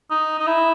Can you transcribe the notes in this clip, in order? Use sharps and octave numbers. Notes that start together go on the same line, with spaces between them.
D#4
D#4
E4